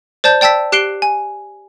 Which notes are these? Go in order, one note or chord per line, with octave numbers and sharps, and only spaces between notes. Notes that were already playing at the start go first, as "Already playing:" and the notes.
C5 D5 A5 G6
D5 G5 A5 E6 B6
G4 F#6 C7 D7 G7
G#5